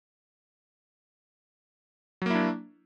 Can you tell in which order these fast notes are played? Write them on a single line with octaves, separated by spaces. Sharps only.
F#3 A#3 E4 D4